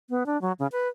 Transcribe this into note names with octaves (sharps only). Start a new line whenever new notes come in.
B3
D4
F#3
C#3
B4